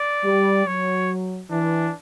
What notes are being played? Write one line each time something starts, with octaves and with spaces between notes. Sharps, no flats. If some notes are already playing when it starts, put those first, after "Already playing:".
Already playing: D5
G3
F#3 C#5
E3 D4